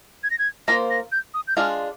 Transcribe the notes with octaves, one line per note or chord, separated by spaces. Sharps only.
G#6
A#6
G#6
A#3 F4 C5 A#6
A#6
G6
D#6
G6
G#3 D4 F4 G#4 F6